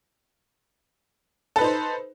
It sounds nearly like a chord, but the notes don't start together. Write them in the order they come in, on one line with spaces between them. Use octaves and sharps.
A4 B4 D#4 C5